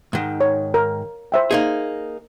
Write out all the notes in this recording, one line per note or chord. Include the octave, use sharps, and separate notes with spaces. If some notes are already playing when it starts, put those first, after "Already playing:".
G#2 D#3
C#5
A#4
C5 E5 G5
A#3 D#4 G#4